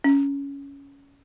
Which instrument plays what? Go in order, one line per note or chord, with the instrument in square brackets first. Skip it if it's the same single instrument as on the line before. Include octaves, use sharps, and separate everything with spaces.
[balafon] C#4